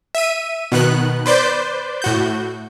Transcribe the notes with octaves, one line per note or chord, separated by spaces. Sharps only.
E5 D#7
B2 D#3 B3 F#6
B4 C5 D5 G6
A2 F#4 G6